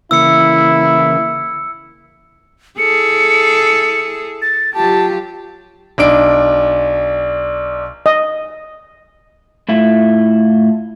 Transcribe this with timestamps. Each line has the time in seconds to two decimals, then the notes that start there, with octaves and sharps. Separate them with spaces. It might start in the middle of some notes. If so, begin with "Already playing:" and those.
0.11 C#3 E3 A#3 E4 E6 C#7
2.78 E4 G#4 A4 C#7
4.42 A6
4.74 F#3 F4 G4 A5
5.98 B1 D4 D7
8.06 D#5
9.69 A2 E4 F4